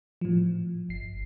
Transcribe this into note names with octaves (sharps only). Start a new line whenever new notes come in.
A2 F3
G1 C7